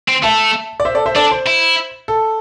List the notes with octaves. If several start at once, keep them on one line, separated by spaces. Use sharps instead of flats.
C4
A3 E5 A5
D5
C5 E5
A4 D5
C5 E5
D4 A4 D5
C5
E4
A4